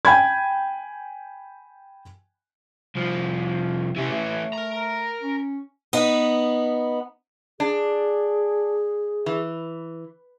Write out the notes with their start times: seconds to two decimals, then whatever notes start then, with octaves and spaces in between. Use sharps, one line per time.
0.05 G5 G#5 B5 G#6
2.95 C2 F3
3.96 C3 E3 C#4
4.12 A3
4.53 A#4 A#5
5.22 C#4
5.93 B3 D#4 B4
7.60 D4 G#4
9.26 E3